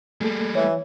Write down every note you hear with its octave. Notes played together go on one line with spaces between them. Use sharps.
G3 A3 A#3 G#4 A4
E3 C#5